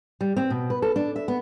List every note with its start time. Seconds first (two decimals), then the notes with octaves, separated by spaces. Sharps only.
0.21 G3
0.37 C4
0.50 B2
0.70 B4
0.82 A4
0.96 D4
1.16 E5
1.28 B3